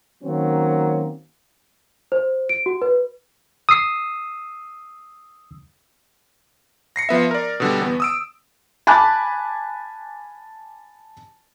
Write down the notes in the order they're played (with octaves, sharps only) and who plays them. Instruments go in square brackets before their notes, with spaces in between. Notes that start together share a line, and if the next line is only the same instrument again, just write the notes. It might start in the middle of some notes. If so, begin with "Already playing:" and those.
[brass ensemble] D#3 F#3 A#3 C4 C#4
[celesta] C5
D7
F#4
B4
[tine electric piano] D#6 E6 C7
[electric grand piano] A#6 C7 C#7
F3 B3 E5
A#4 D5
B2 D3 G3
E2 B3
D#6 E6 D7
[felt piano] G#5 A5 B5 D6 F#6 A6